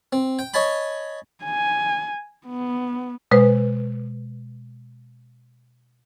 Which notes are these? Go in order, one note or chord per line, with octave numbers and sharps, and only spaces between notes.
C4
G5
C#5 D#5 G#5 A5 B5
G#5
B3
B2 G#3 B4 C5